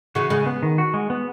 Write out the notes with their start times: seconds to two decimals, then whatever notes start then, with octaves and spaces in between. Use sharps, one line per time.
0.15 C#3 E3 F#4
0.30 C#3 G#3
0.46 B3
0.63 D#3
0.78 F#4
0.94 G#3
1.10 B3